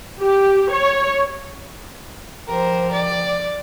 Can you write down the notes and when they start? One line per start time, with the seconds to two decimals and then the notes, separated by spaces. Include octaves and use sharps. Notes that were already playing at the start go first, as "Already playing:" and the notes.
0.21 G4
0.71 C#5
2.48 F3 G4 A#4 C5
2.93 D5